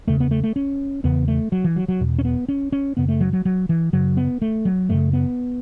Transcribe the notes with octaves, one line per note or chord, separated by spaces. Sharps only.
E2 C#3 A3
B3
A3
A3
C#4
E2 C#3 B3
A3
F#3
E3
F#3
F#3
E2 B2
C#4
B3
C#4
C#4
F#2 C#3 B3
A3
F#3
F#3
F#3
E3
F#2 C#3 F#3
B3
A3
F#3
F#2 C#3 A3
B3